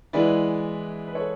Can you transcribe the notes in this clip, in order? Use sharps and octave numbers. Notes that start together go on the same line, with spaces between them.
E3 G#3 B3 E4 B4 D5
B4
A4 C#5